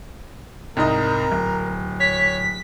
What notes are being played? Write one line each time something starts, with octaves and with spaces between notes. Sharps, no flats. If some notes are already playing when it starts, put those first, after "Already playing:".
C2 G#2 A#4 D#5
D1
C#5 B6